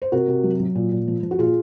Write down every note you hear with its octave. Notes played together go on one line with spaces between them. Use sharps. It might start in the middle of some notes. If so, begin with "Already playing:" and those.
C5
C3 F#4 A#4
C3
F#3
F#3
A#2
A#2
F3
F3
F#4
A#2 F4 G#4